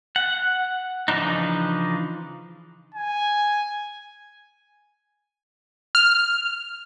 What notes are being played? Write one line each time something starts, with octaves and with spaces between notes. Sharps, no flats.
F#5
C#3 E3 F3 D4 D#4
G#5
F6